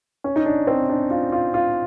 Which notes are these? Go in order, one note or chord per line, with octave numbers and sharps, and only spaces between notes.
C#4
D#4
D4
C4
D4
F4
F4
F4